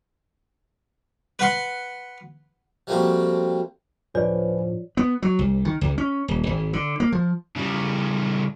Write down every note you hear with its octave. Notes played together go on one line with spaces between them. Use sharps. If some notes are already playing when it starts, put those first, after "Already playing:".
B4 F#5 C6
F3 G3 A3 A#3 C4 F#4
A2 F3 D4 B4 C#5 D5 G#5
B3
F#3
C2
D#3
C#2
C#4
D#1
G#1
D3
A#3
F3
C#3 G3